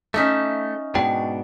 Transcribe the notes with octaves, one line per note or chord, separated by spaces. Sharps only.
A3 C#4 D#4 E5
G#2 B2 D4 G5